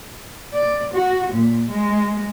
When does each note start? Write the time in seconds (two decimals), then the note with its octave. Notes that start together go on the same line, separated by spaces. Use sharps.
0.53 D5
0.92 F#4
1.30 A#2
1.69 G#3